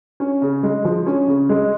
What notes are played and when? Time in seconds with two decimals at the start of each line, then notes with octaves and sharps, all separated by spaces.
0.20 C#4
0.42 C#3
0.63 G#3
0.85 F3
1.06 C#4
1.28 C#3
1.49 G#3